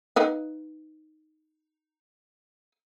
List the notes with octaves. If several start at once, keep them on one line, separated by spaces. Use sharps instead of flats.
D#4 B4 F5